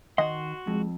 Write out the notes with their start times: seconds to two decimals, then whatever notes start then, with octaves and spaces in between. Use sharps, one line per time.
0.18 D#3 F#4 D#5 F#5 C6
0.67 F2 G#3